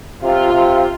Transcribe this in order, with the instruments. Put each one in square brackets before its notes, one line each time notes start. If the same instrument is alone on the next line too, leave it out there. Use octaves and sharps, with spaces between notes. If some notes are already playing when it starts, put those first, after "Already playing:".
[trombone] C3 [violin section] F4
[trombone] C3